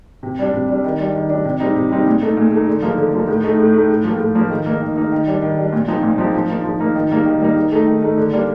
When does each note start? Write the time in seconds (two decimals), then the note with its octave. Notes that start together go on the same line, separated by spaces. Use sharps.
0.23 C3
0.39 G3 D4
0.53 C3
0.69 G3 D4
0.84 D#3
0.99 G3 D4
1.15 D#3
1.30 G3 D4
1.45 C3
1.60 G3 C4 D#4
1.76 C3
1.91 G3 C4 D#4
2.07 A#2
2.22 A3 D#4
2.37 A#2
2.52 A3 D#4
2.67 D3
2.82 F3 A#3 D#4
2.98 D3
3.13 F3 A#3 D#4
3.28 A2
3.44 A3 D#4
3.59 A2
3.74 A3 D#4
3.89 A2
4.04 F3 A#3
4.20 A2
4.35 F3 A#3
4.50 D#3
4.66 A#3 D#4
4.81 D#3
4.96 A#3 D#4
5.12 D#3
5.27 G3 D4
5.42 D#3
5.58 G3 D4
5.73 A#2
5.88 F3 C4 D#4
6.03 A#2
6.18 F3 C4 D#4
6.34 F3
6.49 A#3 D#4
6.64 F3
6.80 A#3 D#4
6.95 D#3
7.11 G3 A#3 D#4
7.25 D#3
7.41 G3 A#3 D#4
7.56 D#3
7.72 A3 D#4
7.86 D#3
8.02 A3 D#4
8.17 D3
8.33 G3 A#3 D4